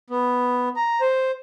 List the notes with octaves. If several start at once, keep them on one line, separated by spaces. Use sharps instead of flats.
B3
A#5
C5